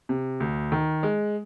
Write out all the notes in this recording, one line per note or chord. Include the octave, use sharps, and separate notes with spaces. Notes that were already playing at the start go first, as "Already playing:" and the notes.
C3
D2
D#3
G#3